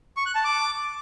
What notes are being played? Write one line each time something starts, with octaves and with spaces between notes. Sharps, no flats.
C#6
F#6
A5
D6